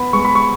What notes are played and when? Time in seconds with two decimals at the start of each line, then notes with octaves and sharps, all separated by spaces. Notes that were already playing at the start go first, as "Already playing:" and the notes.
Already playing: B3 B5
0.13 G#3 C#6
0.25 B5
0.35 C#6